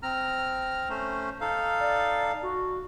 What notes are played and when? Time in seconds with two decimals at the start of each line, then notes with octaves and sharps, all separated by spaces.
0.03 C4 A#5 F6
0.90 A3 C#4 C5
1.41 D#4 A4 F5
1.80 D5
2.42 F#4